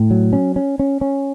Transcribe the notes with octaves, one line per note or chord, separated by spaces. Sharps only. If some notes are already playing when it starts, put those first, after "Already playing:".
Already playing: A2
F#3
C#4
C#4
C#4
C#4